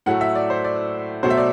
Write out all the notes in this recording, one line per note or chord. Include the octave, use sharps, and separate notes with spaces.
A2 F#3 A3 F#5
E5
D5
C5
D5
B2 F#3 A3 C5
E5
D5